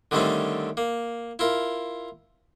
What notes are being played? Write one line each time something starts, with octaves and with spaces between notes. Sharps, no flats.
D3 D#3 G3 A3 C4 C#4
A#3
E4 F4 A#4